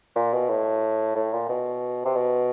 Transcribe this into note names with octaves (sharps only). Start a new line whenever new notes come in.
A#2
B2
A2
A2
A#2
B2
C3
B2